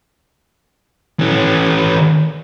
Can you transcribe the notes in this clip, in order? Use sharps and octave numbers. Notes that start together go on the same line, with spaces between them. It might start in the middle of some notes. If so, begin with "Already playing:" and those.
E3 C#4